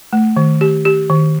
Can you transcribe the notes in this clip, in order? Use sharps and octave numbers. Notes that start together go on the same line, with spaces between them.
A3
D#3
G4
G4
D#3